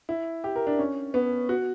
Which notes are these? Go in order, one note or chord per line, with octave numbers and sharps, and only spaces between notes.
E4
G4
A#4
D4
C#4
B3
F#4